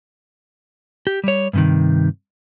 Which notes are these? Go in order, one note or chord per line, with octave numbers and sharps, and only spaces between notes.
G4
G3 C#5
G2 C3 D#3